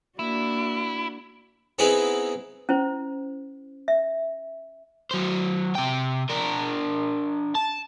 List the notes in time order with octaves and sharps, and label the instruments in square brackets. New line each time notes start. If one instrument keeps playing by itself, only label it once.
[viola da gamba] A#3 D4 F#4 [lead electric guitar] E4
[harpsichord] B3 C4 D#4 E4 G#4 B4
[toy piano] C#4 E4 C5
E5
[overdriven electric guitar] F#3 C5
C3 G5
D4 A#4
A5